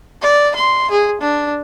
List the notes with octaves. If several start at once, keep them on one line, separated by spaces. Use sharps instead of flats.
D5
C6
G#4
D4